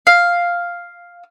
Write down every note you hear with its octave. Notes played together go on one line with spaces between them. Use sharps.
F5